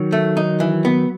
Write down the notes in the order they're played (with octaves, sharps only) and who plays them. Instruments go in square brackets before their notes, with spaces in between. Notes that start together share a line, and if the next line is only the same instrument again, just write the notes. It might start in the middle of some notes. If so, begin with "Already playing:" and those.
Already playing: [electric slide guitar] D#3 F#3
[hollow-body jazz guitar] A3
D#4
E3
B3